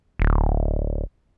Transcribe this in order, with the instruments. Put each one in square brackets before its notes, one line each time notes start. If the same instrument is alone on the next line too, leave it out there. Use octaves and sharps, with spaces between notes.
[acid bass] D1